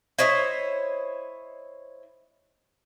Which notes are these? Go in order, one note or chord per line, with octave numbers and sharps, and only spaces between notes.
E4 C5 C#5 D#5